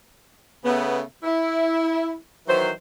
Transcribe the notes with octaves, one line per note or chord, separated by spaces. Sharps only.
C#3 A3 B3
E4
D#3 E3 F#3 C5